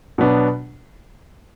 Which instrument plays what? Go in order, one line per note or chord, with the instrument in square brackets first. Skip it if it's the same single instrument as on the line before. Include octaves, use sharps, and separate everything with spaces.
[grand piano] B2 F#3 B3 D4